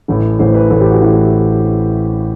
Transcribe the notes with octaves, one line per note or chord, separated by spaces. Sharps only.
A1 A2 E3
A1 A2 E3 C5
B4
A1 A2 E3 A4
G4
F#4
A1 A2 E3 E4